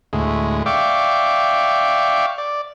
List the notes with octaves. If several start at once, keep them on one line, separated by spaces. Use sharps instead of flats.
D2 A2 G#3
D5 E5 F5 G5 C#6 D6
D5